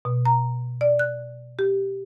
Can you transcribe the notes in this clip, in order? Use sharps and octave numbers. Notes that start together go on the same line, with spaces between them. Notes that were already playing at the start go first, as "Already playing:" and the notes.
B2
A#5
D5
F#6
G4